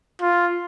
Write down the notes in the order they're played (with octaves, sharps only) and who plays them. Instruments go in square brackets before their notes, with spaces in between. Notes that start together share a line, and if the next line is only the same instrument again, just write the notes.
[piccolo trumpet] F4